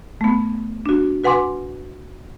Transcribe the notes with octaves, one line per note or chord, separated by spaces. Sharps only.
A3 B3
D4 F#4
F#4 B4 F#5 G#5 C6 D6